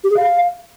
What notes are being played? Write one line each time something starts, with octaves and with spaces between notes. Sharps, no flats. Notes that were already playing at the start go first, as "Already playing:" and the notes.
G4
G#4
F5